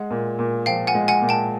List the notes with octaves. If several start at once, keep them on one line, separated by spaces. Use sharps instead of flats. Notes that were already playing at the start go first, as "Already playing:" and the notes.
Already playing: G#3 F#5
A#2
A#2
F3 F5 G5
F#5 G#5
G#3
F#5 G#5
A#2
G5 A5